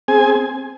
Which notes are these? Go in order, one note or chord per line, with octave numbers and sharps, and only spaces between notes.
C4 G#4 G#5